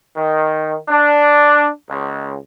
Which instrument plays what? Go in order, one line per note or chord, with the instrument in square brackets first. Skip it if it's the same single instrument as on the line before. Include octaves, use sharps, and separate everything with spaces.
[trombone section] D#3
D4
C#2